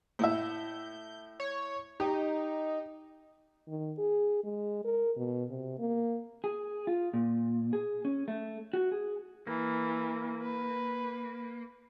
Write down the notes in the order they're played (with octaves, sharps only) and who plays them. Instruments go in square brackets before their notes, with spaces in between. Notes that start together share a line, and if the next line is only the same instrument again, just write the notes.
[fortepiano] A2 E4 E5 [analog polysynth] G6
[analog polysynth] C#5
[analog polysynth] D#4 [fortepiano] G4
[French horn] D#3
G#4
G#3
A#4
B2
C3
A#3
[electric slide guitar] G#4
F4
A#2
G#4
C#4
A3
F#4
G#4
[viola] E3 [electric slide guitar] A#3
[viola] B4